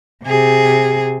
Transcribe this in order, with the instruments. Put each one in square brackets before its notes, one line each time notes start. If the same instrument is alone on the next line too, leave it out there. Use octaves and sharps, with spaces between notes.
[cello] C3 G#4